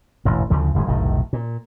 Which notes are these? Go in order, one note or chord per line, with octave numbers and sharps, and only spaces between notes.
E1 A1 G#2
D2 C#3 F3
D1 G1 F3 G#3
F1 B1 A2 D#3
A#2